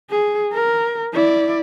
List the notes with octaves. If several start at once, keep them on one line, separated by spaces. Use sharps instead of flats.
G#4
A#4
E4 D5